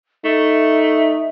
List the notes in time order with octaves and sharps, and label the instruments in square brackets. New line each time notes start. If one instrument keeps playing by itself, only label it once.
[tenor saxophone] A3 [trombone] D#4 [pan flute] E5